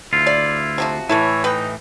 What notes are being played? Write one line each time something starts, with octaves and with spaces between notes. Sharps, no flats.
D2 E4 F4
D5
C3 F3 F#4
A2 E3 E4 A4 B4 C#5
D#4 B4 G5